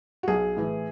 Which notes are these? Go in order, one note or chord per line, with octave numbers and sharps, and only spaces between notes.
F#4
B1 G#4
A2 E3